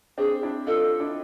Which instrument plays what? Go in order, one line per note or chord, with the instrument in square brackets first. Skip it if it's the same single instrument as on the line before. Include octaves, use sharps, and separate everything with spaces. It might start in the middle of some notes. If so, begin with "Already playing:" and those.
[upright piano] C4 D4 [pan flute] G#4
[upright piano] D4 E4
[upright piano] D#4 F4 [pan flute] A4
[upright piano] D4 E4